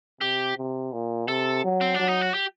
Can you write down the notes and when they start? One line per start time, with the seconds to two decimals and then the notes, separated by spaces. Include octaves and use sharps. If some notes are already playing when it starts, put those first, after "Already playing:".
0.21 C3 G4
0.57 C3
0.93 A#2
1.28 C3 A4
1.64 F#3
1.81 C4
1.94 D4
2.00 F#3
2.08 D#4
2.21 F#4
2.34 G4